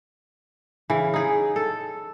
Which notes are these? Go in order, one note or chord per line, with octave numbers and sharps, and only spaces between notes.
C#3 E3
D#4 G#4
A4